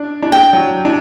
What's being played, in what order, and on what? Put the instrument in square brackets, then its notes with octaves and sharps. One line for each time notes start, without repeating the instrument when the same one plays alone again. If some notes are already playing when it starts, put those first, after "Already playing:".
Already playing: [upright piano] D4
D4
[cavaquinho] G5
[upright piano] F#3
D4